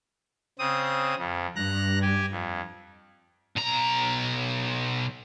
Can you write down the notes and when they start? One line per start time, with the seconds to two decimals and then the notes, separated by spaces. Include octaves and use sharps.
0.59 C#3 C4 D#6
1.18 F2
1.56 G2 A#5 F#6 A#6
2.02 G4 G#5
2.31 F2
3.57 B1 A#5